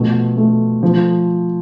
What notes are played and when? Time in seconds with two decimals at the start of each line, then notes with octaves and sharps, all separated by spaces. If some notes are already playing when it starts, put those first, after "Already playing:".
Already playing: B2 F3 A3
0.37 A3
0.83 F3